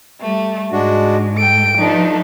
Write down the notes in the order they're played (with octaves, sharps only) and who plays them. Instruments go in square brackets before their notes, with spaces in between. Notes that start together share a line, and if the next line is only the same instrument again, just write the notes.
[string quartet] G3 A3
[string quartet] G#2 [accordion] G#3 D4 F#4
[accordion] A4 [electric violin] G5 D7
[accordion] G2 E3 [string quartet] F3 A3 D4 [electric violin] D#4